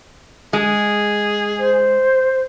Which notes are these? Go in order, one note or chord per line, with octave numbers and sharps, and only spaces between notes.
G#3 G#4
C5